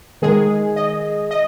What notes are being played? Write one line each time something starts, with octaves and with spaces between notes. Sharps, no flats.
D#3 G#3 G#4
D#5
D#5